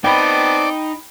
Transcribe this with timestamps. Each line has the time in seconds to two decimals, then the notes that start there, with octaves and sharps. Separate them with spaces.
0.04 B3 C4 D#4 D5 G5 A5 B5